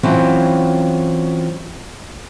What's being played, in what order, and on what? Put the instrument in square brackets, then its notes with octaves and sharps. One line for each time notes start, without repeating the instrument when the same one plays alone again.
[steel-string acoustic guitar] E3 F#3 C4 C#4 F4